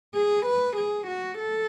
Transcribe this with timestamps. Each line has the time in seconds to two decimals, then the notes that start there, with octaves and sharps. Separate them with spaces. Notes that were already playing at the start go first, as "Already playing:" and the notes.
0.15 G#4
0.46 B4
0.77 G#4
1.07 F#4
1.38 A4